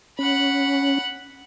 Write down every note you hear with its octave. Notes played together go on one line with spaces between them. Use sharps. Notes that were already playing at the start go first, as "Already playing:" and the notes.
C#4 F#5 B5